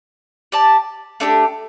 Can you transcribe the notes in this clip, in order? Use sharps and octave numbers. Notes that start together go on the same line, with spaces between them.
G4 D5 A5
A3 D4 G4